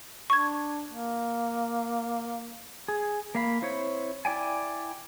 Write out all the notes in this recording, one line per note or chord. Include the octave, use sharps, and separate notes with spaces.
D4 C#6 G#6
A#3
G#4
A#3 F5 B5
C4 E4 C5 C#5
E4 D5 G5 G#5